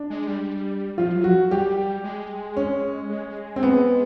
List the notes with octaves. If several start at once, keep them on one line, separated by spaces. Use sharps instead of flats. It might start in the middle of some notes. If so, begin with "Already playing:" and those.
Already playing: D4
G#3
G3
F3 F4
F#3
F#4
G3 G4
G#3
C#4
G#3
C4
B3